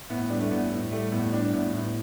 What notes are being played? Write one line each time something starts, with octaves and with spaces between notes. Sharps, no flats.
A2 B3
G3 D4
A3
A2 B3
A2
G3 A3
A2 B3
G3 D4
A2 B3
A2